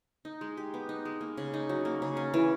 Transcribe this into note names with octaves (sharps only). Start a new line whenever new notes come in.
D#4
G#3
G4
B3
D#4
G#3
A#3
C#3
D#4
F#3
A#3
C#3
C#4
E3